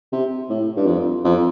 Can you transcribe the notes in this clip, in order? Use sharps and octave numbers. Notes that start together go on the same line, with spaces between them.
C3
A2
G2
F2
F2